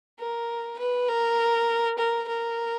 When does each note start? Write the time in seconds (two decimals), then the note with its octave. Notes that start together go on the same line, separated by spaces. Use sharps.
0.19 A#4
0.79 B4
1.08 A#4
1.98 A#4
2.28 A#4